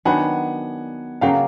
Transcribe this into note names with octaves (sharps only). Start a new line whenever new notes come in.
D#3 F#3 B3 D4 F#5 G#5
C#3 F#3 A#3 F5 G5